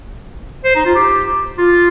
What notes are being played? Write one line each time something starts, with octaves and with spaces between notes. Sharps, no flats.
C5
D#4
F4
G4
F4